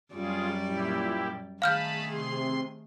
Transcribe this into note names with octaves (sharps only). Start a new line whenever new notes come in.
F#2 G3 F4 G#4 D5
A#2 E4 G4
D#3 A3 G#4 F5 A5 B5 F6 G6
C3 C6